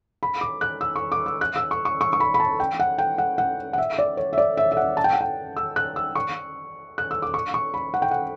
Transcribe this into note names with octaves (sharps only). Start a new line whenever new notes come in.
B5
D6
F#6
E6
C#6
D6
E6
F#6
E6
C#6
C#6
C#6
C#6
B5
B5
A5
G5
F#5
G5
F#5
F#5
F#5
E5
D5
C#5
E5
D5
E5
E5
F#5
A5
G5
F#5
G5
E6
F#6
E6
C#6
F#6
E6
D6
C#6
C#6
B5
F#5
G5
F#5